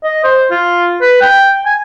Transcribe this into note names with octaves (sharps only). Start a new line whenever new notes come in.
D#5
C5
F4
B4
G5
G#5